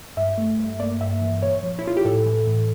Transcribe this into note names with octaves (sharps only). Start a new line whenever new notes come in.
G2 E5
A3
G2
A#3 D5
G2 E5
E3
A#2 C#5
F3
E4
F3 F4
G4
A2 A4
E3
A2